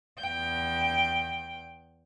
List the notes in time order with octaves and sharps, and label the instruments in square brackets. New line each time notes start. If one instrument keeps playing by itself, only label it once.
[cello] E2 G5